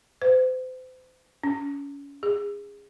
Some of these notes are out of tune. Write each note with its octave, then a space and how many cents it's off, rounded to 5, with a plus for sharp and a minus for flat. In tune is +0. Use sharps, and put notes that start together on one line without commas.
C5 -35
C#4 +30
G#4 -25